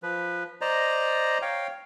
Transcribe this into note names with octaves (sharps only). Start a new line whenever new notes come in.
F3 B4
C5 D5 D#5 A#5
C#5 F5 G5